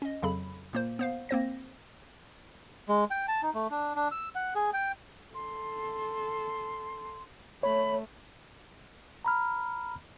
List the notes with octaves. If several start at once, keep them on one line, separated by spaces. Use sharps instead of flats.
C#4 D#5
F2 C#3 F#3 A4 B5
A#2 A#3 C5
B3 C5 F5
A#3 C4 C5 A#6
G#3
G5
A5
D#4
A3
D4
D4
E6
F#5
G#4
G5
A4 C6
A3 C#5 B5
A#5 B5 F6